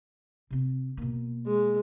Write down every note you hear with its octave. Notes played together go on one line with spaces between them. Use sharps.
C3 C4
B2 A#3
G#3